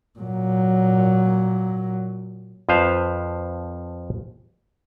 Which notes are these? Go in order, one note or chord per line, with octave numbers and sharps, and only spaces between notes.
A#2 F#3
F2 F3 B4 C5 F5